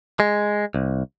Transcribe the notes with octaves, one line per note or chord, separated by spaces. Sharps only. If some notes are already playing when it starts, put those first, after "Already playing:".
G#3
C2